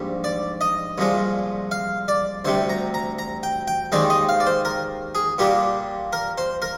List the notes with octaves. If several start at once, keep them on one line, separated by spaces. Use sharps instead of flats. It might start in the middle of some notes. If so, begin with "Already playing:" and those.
Already playing: A#1 G#2 G3
D5
D#5
C2 A#2 F3 G#3
F5
D5
D2 C3 G3 C5
A#5
A#5
A#5
G5
G5
D#2 D#3 G#3 C4 D5
D#5
F5
D5
C5
A#4
G#4
A#2 G3 A#3 D4 G4
A#4
C5
A#4